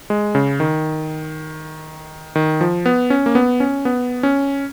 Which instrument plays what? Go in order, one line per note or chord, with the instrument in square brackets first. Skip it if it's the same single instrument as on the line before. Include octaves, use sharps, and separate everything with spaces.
[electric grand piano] G#3
C#3
D#3
D#3
F3
B3
C#4
A#3
B3
C#4
B3
C#4